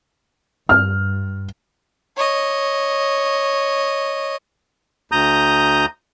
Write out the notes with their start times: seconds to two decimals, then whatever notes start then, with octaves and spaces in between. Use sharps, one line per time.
0.69 G2 F6
2.16 C#5 D#5
5.12 D2 A#5 D#6 G6